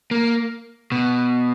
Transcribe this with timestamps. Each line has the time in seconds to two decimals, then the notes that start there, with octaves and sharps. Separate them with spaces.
0.11 A#3
0.92 B2